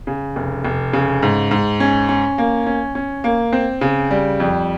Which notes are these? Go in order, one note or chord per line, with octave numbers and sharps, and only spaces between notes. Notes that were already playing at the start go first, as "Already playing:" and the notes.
C#3
F1
F1
C#3
G#2
G#2
C#4
C#4
A#3
C#4
C#4
A#3
C4
C#3
G3
F2